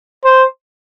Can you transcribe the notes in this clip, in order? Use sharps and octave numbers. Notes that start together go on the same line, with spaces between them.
C5